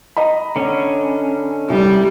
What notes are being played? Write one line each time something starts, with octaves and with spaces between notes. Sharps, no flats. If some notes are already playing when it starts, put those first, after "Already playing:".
D#5 A#5 B5
D3 C#4
C2 G3